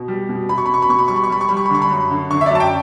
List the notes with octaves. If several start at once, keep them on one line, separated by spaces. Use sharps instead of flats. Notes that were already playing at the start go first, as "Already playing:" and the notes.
Already playing: B2
G3
B2
B2 B5
C#6
B5
B2 C#6
B5
B2 C#6
B5
G3 C#6
B5
C#6
G3 B5
C#6
G3 B5
C#6
B5
D3 C#6
B5
F#2
D3
D3 C#6
E5
D5
F#2 A5
G5